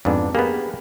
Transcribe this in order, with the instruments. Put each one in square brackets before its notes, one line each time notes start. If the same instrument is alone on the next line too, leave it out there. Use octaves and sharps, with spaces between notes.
[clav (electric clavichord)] F2 G#2 [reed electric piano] B3 D4 B4
[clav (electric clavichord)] A#3 B3 [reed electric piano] G4 G#4 B5